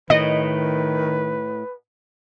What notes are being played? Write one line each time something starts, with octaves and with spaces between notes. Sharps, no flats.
A2 D#3 B4 D#5